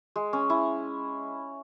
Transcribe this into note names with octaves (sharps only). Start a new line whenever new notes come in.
G#3
C#4
E4